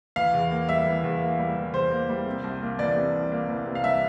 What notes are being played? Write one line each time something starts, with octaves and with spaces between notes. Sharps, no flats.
E3 F5
E2
A#3
G3 E5
E3
E2
A#3
G3
E3
E2 C5
A#3
G3
C3
C2
A#3
E3 D5
C3
C2
A#3
E3
C3
F5
C2 E5